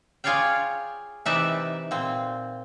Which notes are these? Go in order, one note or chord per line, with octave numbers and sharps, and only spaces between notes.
F4 G#4 C#5 D5 F5 G5
C3 E3 D#4 B4 D5 E5
A#2 C4